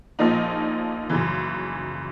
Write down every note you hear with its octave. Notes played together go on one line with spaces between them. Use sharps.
A#1 A#2 F3 A#3 D#4
F#2 C#3 E3